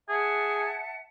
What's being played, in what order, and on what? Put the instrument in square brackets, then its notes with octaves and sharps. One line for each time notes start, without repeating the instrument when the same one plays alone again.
[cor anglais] G#4 [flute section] E5 F#5 A5